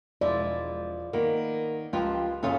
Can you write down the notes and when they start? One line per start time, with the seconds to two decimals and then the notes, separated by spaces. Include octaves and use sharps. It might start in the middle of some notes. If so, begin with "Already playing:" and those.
0.21 E1 F3 G#3 E4 D5
1.13 D#3 A#3 B3
1.93 C#2 F3 F4 G4
2.43 F#2 A#2 C#3 F4 A4 C#5